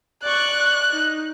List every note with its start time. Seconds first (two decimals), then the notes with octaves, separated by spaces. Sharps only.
0.24 D5 C#6 F#6
0.91 D#4